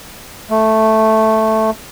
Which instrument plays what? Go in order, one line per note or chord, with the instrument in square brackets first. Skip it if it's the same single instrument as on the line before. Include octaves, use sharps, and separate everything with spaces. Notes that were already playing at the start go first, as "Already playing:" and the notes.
[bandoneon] A3